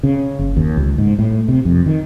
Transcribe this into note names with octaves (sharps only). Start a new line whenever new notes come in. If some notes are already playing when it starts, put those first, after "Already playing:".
C#3
F#1
D#2
C#2
G#2
A2
C3
F2
D#3